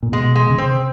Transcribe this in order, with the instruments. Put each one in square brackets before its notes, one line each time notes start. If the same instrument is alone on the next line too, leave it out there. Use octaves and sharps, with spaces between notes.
[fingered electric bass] A#2
[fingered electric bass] B2 [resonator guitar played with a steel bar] G#3
[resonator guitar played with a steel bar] G#3
[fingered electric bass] C#3
[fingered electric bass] C3 [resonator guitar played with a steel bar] C4